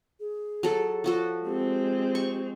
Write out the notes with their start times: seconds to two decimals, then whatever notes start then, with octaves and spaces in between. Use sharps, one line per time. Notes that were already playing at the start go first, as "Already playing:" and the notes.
0.20 G#4
0.63 F#3 A4
1.04 F3 F#4 A4
1.45 G#3 C4 G4
2.15 C#6